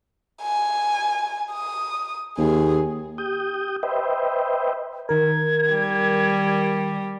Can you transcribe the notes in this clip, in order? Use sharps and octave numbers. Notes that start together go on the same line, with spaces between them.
G#5
D#6
D#2 G#4
G4 D#6 G6
B4 C5 D#5 E5 G5
D#3 A#4 G#6
G3